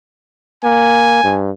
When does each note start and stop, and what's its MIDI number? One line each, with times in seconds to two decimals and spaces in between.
0.64 1.19 58
0.64 1.39 80
1.24 1.51 43